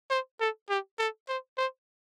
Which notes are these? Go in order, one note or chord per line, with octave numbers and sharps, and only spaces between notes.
C5
A4
G4
A4
C5
C5